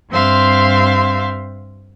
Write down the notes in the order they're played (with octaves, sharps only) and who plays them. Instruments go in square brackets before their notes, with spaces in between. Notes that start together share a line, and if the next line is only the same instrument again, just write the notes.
[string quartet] G2 C4 E5 F5 C6